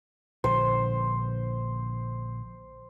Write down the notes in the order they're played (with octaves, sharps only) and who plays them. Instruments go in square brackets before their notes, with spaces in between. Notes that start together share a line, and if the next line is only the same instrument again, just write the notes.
[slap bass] A#1 D3 [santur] C5